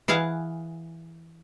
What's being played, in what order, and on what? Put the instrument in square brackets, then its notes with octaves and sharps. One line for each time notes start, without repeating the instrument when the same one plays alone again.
[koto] E3 G#4 F5 F#5